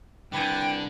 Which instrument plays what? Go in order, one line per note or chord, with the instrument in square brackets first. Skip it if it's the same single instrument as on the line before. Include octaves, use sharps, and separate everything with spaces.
[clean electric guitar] C2 B4 G#5 [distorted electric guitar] D3 [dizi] G5